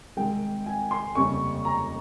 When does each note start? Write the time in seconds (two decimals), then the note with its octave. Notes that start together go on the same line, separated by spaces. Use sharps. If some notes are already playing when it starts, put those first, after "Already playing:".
0.17 C2 C3 D#3 G#3 G5
0.66 G#5
0.91 C6
1.15 F1 D#2 C#3 G3 C#6
1.65 A#5